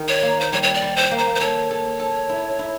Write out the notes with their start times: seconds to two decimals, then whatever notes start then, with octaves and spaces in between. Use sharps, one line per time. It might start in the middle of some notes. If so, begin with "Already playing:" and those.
Already playing: D#3
0.08 C#5
0.22 A#3
0.41 C5
0.52 G3 C#5
0.63 C#5
0.74 D5
0.82 G3
0.96 C5
1.11 A#3
1.18 C5
1.35 C5
1.40 A4 C#5
1.71 A4
1.99 A4
2.29 E4
2.59 E4